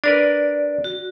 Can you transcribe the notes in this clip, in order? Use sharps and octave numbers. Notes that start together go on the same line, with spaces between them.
D4 A#4 B4 D5
F#4